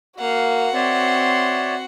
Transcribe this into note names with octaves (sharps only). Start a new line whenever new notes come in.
A#3 F#4 F5 F#5
C4 C#5 D5 E5 C6